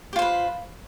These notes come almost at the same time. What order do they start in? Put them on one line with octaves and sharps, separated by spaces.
G4 F4 C5 B4